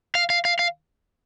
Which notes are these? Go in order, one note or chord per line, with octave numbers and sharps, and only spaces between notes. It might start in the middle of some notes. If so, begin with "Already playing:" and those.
F5
F5
F5
F5